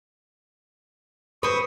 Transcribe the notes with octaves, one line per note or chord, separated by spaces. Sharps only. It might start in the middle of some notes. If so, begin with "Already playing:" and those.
C4 B4 C#6 D#6